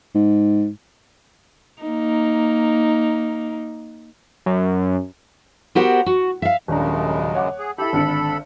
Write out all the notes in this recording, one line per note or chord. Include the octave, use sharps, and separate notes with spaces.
G#2
A#3 D#4
F#2
B3 F#4 G4 A#4 C5 F#5
F#4
E5 F5
D#1 F#2 C#3 G#3 D4 A#5
C#5 F#5 D6
G#4
E4 G4 A4 B5
G#1 D3 C#7